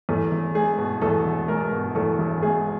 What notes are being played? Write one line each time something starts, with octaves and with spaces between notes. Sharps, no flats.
E2 A4
E1
G#3 G#4
B2
E2 A4
E1
G#3 A#4
B2
E2 A4
E1
G#3 G#4